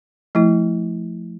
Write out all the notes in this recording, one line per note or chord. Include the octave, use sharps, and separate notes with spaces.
F3 A3 E4